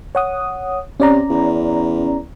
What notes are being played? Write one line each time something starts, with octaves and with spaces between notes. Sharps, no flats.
C#5 F#5 D#6
C3 C#4 D5 A#5
E2